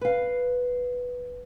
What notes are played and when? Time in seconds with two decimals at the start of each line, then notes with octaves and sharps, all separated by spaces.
0.01 B4 F5